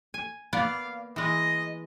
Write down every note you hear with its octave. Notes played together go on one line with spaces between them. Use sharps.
G#5
A#3 B3 D5 F5
E3 G#3 D#5